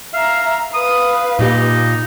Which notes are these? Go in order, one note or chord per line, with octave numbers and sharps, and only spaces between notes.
E5 F5 A#5
B4 F5 D#6
A#2 D#4 G4